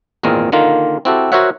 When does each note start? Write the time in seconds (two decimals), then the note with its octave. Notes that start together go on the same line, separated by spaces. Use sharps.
0.23 G#1 E2 A#2 G#3 C4 A#4
0.52 D3 D#3 A#3 F4
1.05 C4 E4 F#4 G4 A4
1.32 F#4 A#4 C5 C#5 E5 F#5